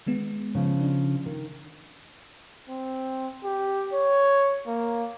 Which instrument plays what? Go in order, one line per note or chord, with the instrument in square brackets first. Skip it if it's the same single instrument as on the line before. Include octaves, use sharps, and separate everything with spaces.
[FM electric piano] D#3 G#3 B3
[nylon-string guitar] C#3 F3
[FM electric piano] D4
[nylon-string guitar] D#3
[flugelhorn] C4
G4
C#5
A#3